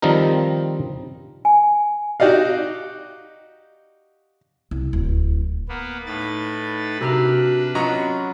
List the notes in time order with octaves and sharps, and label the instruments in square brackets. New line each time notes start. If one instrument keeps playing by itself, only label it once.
[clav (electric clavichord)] D#3 F3 G3 C4 D#4 A#4
[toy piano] G#5
[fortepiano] D#4 F#4 G4 D5 D#5 F5
[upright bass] C2
D1
[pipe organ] A#3 B3
[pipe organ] A2 B4 A6 [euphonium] D#4
[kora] C3 A#4 F5 [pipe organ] D4 B4 [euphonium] F#4
[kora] F#3 F4 F#5 [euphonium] C#4 [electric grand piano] D#5 A#5 C#6